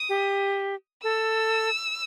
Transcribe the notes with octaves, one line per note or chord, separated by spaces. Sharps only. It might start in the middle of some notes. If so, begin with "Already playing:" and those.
Already playing: D#6
G4
A4 E6